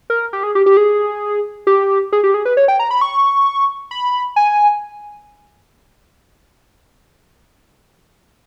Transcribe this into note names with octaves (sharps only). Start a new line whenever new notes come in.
A#4
G4
G#4
G4
G4
G#4
G4
G#4
G4
G#4
B4
C#5
G5
A#5
B5
C#6
B5
G#5